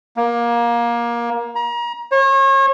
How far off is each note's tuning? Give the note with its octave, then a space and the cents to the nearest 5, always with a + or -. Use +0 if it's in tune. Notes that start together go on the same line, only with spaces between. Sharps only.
A#3 +20
A#5 +35
C#5 -35